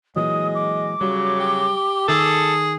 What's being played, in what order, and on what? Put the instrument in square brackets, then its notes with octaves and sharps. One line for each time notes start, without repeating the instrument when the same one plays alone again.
[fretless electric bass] A#2 E3 F#3 [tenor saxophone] G#3 [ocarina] D#6
[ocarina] D6
[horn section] C#3 F#3 [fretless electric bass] G3
[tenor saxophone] G4
[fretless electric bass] D#3 [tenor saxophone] G#4 [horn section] A4